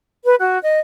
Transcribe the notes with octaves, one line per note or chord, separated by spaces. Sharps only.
B4
F#4
D#5